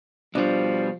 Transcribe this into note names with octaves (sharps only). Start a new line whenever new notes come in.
B2 F3 G3 D4